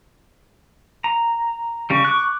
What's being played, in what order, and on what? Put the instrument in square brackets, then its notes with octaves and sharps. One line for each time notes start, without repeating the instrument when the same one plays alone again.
[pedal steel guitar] A#5
[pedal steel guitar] C#3 G3 [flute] C#6
[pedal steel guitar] D6 F#6